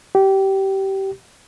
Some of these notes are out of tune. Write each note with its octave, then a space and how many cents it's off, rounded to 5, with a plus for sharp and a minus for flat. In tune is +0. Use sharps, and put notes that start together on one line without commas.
G4 -20